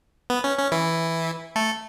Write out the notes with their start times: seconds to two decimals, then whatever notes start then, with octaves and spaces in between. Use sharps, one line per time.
0.30 B3
0.44 C#4
0.58 C#4
0.72 E3 E4
1.56 A3 A4